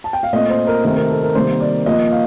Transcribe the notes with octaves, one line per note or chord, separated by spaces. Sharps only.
A5
G5
F5
A#2 A3 C4 D#5
C5
A#4
C3 D#3 A3 C4 A#4
A#4
A4
A#4
C3 D#3 G3 A#3 C5
D5
A#2 F3 A#3 D#5
F5